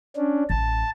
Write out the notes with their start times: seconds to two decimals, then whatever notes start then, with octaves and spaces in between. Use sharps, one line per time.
0.16 C#4 D4
0.50 A1 A5